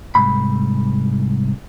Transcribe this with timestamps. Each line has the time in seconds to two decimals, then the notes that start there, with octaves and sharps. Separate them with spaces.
0.15 C2 G#2 B5